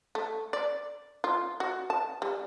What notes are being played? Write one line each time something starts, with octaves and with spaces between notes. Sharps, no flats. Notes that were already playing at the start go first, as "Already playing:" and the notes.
A3
D5
F4
F#4
A5
G3